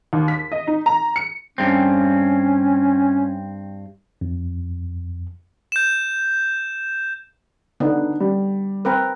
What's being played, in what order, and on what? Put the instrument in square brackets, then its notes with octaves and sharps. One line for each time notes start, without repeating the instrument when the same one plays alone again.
[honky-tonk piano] D#2
B6
D#5
D#4
A#5
C#7
[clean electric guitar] G2 C4 [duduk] C#4
[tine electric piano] F2
[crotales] G6 E7
[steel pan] D3 B3 [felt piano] D4 D#4
[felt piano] G3
[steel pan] C4 A#4 B4